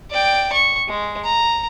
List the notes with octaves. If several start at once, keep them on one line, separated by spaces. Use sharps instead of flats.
D5 G5
C#6
G#3
A#5